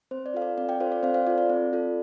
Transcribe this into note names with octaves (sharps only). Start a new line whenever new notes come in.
C4 C5
D5
F4 A4 F5
D5
C4 D5
D5 G5
F4 A4 C5 F5
D5
C4 C5 F5
C5 F5
F4 A4 D5
D5
C4
F4 A4